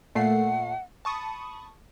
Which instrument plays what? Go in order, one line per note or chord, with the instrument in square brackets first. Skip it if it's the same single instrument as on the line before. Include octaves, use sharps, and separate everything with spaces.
[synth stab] A#2 A3 C7 [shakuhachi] F#5
[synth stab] A5 C#6 D#6 [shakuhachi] B5